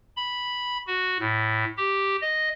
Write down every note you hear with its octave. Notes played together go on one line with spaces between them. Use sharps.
B5
F#4
A2
G4
D#5